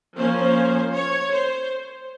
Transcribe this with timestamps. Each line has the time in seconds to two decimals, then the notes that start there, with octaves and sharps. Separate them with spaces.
0.17 F3 A#3 C#4 C5
0.93 C#5
1.32 C5